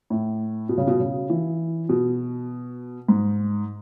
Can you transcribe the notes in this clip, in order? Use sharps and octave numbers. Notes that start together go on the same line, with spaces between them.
A2
B2
C#3
B2
C#3
E3
B2
G#2